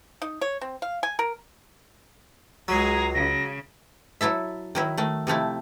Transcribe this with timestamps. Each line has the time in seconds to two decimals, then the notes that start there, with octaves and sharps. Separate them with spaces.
0.22 D#4
0.41 C#5
0.61 C4
0.82 F5
1.03 G#5
1.19 A#4
2.68 C#2 F#3 G#3 G#4 A#5
3.14 C#3 A#6
4.21 F#3 E4 A4 E5
4.75 D#3 F#3 E4
4.97 D#3 A3
5.27 C3 F3 A3 E4